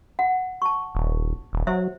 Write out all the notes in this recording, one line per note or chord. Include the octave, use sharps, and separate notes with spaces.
F#5
A5 C#6
D#1
D#1
F#3 C5 E5